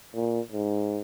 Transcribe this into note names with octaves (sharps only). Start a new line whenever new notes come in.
A#2
G#2